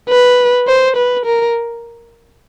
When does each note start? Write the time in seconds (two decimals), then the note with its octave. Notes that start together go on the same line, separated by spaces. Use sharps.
0.09 B4
0.68 C5
0.97 B4
1.26 A#4